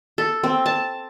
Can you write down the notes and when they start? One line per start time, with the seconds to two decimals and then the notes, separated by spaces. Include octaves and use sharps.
0.18 A4
0.44 C4
0.66 A5